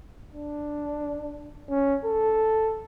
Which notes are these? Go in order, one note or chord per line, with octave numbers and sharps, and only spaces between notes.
D4
C#4
A4